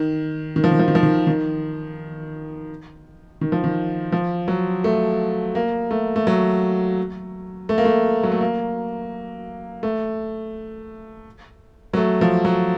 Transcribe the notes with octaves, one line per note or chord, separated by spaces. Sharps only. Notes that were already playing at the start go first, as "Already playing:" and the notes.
Already playing: D#3
D#3
F3
D#3
F3
D#3
F3
D#3
D#3
D#3
F3
D#3
F3
F#3
A3
A#3
A3
A3
F#3
A3
A#3
A3
F#3
A3
A#3
A3
F#3
A3
F3
F#3